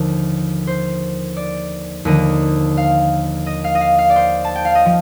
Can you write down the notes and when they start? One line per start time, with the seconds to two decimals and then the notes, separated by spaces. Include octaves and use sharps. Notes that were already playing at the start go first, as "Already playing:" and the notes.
Already playing: D#2 D3 F3
0.67 C5
1.37 D5
2.05 D#2 D3 F3 D#5
2.77 F5
3.46 D#5
3.64 F5
3.75 D#5
3.81 F5
3.98 F5
4.10 D5
4.16 C5
4.45 A5
4.56 G5
4.65 F5
4.75 D#5
4.85 F3